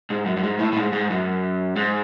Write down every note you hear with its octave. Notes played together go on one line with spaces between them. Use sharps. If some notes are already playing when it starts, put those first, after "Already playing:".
G#2
F#2
F#2
G#2
A2
A2
G#2
G#2
F#2
G#2